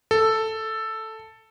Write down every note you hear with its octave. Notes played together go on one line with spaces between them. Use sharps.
A4